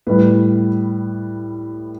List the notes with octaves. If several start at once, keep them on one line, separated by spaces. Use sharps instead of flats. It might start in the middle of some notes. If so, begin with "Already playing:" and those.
A2 G3 B4